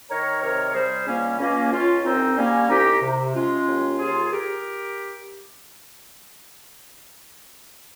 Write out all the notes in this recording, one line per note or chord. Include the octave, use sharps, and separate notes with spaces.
D#3 A#4 C#5
C3 A#4 C#5
C#5
G3 G#4 C5
C#2 A#3 C#4
C#2 A#3 C#4
C#2 C#4 F4
C2 C4 D#4
G3 A#3 C#4
C2 D#4 G4
C3
G#3 C#4 F4
D#2
D#2 F4 G#4
G4 A#4